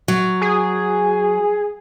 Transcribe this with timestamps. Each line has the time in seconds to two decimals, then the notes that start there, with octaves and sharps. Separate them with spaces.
0.08 F#3
0.41 G#4